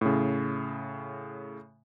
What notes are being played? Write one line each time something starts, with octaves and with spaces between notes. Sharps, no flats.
A2 C#3